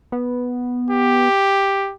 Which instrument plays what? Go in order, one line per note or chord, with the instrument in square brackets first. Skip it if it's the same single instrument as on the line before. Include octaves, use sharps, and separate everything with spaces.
[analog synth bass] B3
[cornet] G4